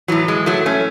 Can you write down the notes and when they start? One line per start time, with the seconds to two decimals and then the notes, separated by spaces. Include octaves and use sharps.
0.08 A2 E3 F#3
0.28 G#3
0.46 F#3 A3
0.66 A3 C#4